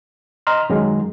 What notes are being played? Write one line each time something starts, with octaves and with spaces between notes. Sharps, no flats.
D#5 A#5 C6 F6
F#2 D#3 F#3 G#3